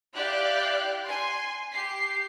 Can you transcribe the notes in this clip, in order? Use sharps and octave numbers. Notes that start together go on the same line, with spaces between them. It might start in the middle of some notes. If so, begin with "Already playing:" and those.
E4 G4 D5 F5 G5 F#6
G#5 C6
G4 C7